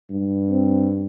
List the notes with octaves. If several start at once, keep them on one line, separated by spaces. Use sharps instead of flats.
G2
C4